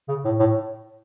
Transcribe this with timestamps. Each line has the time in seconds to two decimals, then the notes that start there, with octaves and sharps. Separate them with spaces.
0.08 C#3
0.25 A2
0.39 A2